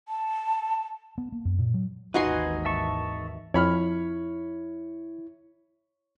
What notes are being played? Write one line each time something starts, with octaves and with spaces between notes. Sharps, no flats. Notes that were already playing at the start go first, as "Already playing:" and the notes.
A5
B3
A#3
F#2
A#2
F#3
G#1 D#2 E3 D#4 F#4 B4 G#5 C6
E5 A5 C#6
F2 E4 C#5 B5 F6